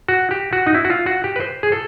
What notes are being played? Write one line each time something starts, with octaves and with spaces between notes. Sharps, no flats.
F#4
G4
F#4
D#4
E4
F#4
F4
F#4
G4
B4
C5
G#4
A4